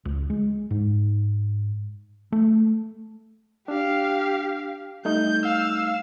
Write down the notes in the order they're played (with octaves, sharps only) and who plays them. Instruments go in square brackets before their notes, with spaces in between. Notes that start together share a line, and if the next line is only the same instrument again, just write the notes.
[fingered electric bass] C#2
G#3
G#2
A3
[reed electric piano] D4 [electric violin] G4 F5
[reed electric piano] G3 A3 D#4 [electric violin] G6
[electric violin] F5 E6